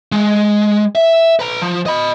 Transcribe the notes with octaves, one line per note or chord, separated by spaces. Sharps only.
G#3
E5
B4 A#5
F3
D#5 B5